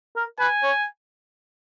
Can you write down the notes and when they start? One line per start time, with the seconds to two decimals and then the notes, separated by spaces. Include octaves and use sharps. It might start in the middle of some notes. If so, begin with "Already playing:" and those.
0.16 A#4
0.39 B4 G#5
0.63 C#5